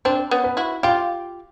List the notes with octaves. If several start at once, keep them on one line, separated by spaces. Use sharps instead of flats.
C4 D4 C5
B3 C#4
B4
E4 F#4
F4 G4 F5